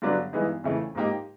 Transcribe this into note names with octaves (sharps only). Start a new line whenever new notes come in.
G2 D3 F#3 B3 D4
G2 E3 G#3 B3 D#4
F2 C#3 E3 A3
G#2 F3 A#3 D#4 G4